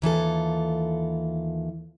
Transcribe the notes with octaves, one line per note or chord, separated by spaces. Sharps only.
D#2 E3 F4 A4